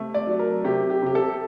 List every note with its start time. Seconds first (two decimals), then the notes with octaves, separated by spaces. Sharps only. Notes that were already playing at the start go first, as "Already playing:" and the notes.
Already playing: C3 A3
0.14 D5
0.27 F#3
0.39 A#4
0.64 C3 G4
0.90 G4
1.02 C3 G4
1.15 A4